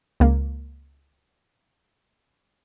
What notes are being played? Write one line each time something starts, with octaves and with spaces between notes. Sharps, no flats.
C#2 A#3